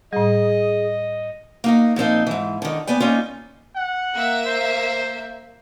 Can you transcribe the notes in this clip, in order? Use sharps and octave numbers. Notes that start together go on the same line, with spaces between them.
A2 G3 G#4 D#5
A#3 D#4 F#5
A#2 F3 C4 D#4
G#2 E3
D3 D#3
B3 D5 G5 G#5
A#3 C#4 D#4 F4
F#5
A#3 E5
C5